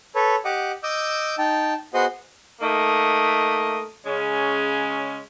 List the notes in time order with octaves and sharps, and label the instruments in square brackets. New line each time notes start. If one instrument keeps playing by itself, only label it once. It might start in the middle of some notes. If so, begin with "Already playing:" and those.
[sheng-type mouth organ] A4 B4 C#5
G4 D#5 F#5 D6
D#5 D6 E6 G6
D#4 G5 A5
B3 F#4 G#4 C5 D#5 C6
[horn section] A3 A#3 D#4 D#5
C#3 G#3 C#4